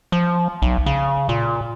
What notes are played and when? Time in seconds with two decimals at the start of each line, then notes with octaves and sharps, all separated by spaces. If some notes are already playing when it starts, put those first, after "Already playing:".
0.12 F3
0.62 B1
0.86 C#3
1.29 A#2